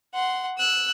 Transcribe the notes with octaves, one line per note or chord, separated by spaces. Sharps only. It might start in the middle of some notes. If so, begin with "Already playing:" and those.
F#5 C6
E6 F#6